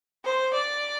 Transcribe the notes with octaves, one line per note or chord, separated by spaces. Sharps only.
C5
D5